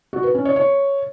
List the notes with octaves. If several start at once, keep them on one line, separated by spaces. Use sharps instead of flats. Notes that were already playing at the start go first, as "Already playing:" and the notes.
F#4
B4
C#4
C#5
C#5